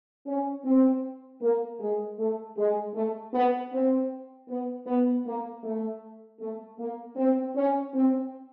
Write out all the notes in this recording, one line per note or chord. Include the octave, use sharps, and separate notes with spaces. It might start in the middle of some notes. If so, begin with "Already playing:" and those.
C#4
C4
A#3
G#3
A3
G#3
A3
B3
C4
B3
B3
A#3
A3
A3
A#3
C4
C#4
C4